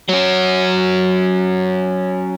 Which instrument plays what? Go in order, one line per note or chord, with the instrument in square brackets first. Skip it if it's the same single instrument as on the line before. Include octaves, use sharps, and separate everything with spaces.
[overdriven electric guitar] F#3 C#4